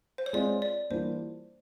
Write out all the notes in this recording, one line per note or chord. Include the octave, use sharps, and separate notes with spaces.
C5
C#5
G#3 C4 F4 D5
D5
E3 G3 A#3 D4 F4 C5